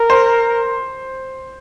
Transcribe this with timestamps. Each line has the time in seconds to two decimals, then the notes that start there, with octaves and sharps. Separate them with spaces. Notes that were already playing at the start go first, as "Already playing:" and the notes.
Already playing: A#4
0.10 C5